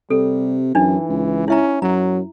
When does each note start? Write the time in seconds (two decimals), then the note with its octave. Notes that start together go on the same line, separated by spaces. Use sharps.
0.10 C3 G3 A4
0.75 F#2 E3 D4 D#4
1.09 C#2
1.48 C#4 E4 E5 A#5
1.82 F#2 F#3 A#5